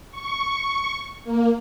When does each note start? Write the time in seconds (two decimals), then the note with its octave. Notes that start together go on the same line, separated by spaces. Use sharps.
0.11 C#6
1.24 A#3